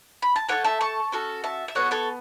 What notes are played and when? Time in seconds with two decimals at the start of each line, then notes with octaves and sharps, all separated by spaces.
0.22 B5
0.36 A5
0.49 A3 F#4 A4 C#5 F#5
0.64 E5 A5
0.81 A5 C#6
1.12 C#4 F#4 A4
1.44 E5 A5
1.68 E5
1.75 B3 F#4 A4 C#5 F#5
1.91 A4 C#5